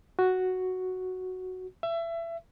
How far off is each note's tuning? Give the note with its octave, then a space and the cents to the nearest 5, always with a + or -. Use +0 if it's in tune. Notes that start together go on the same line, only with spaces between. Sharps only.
F#4 +0
E5 +25